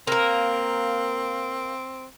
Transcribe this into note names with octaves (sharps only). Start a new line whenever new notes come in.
A#3 C4 A#4